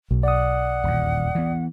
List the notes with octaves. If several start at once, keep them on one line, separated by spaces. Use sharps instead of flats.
B1
D5 F#5 D#6
D#1 E2
E3 B3